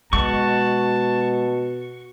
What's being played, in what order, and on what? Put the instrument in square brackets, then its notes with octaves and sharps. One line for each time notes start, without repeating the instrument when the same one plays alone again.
[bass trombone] B2 [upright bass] G#3 [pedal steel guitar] F#4 C#6 [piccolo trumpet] A5